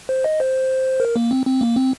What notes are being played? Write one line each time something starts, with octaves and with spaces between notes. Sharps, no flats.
C5
D#5
C5
A#4
A#3
C4
C4
A#3
C4